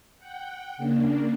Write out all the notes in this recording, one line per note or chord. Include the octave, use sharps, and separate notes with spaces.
F#5 G5
C#3 A#3 D4